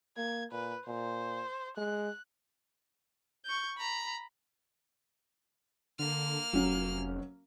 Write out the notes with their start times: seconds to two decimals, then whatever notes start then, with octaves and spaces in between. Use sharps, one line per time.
0.17 A#3 G#6
0.51 A#2 B4
0.87 A#2 C5
1.77 G#3 F#6
3.45 C#6 G6
3.78 A#5 B5
5.99 D3 A#3 F6
6.53 F1 F#3 C#4